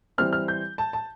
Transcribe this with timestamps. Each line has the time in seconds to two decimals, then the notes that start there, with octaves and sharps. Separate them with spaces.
0.18 E3 G3 C4 F6
0.33 F6
0.48 G6
0.78 A5
0.93 A5